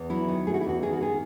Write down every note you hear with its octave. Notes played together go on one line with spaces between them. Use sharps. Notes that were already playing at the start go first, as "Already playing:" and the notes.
Already playing: E2
F#3 E4
D#3
A3 G#4
F#4
E4
E2 F#4
D#3 G#4
F#4
D#3 G#4